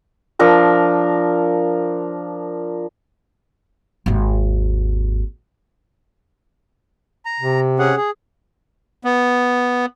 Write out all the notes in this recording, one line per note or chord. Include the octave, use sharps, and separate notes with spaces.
F3 D4 A#4 E6
G#1 D#2
A#5
C3
C#4 G#4 F#5
G#4
B3